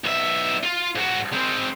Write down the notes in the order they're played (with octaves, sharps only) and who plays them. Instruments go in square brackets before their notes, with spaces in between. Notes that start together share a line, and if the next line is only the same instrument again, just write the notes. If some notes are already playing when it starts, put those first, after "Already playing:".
[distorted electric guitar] B1 E5
F4
G#2 F#4
G#3 C4